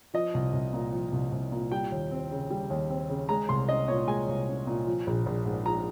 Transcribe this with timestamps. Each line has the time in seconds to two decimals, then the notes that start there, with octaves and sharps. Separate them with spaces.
0.14 F3 D#5
0.34 C2
0.53 C2
0.73 A#2
0.92 F3
1.12 C2
1.32 C2
1.52 A#2
1.72 G3 G5
1.92 D#2
2.11 C4
2.31 C#3
2.50 G3
2.70 D#2
2.90 C4
3.09 C#3
3.29 G#3 A#5
3.49 C2 C6
3.68 C#4 D#5
3.88 A#2 C#5
4.08 G#3 G#5
4.28 C2
4.48 C#4
4.67 A#2
4.86 F3
5.07 A#1
5.26 A#1
5.45 G#2
5.66 F3 A#5